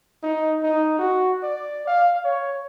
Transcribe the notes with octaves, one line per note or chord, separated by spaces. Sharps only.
D#4
D#4
F#4
D5
F5
C#5